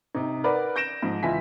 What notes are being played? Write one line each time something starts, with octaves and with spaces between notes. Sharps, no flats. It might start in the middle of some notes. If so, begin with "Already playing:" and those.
C3 D#4
A#4 B4 D5 F#5 B5
G6 A#6 D7 E7
G#2 F3
C#2 E3 E4 F4 G#5 B6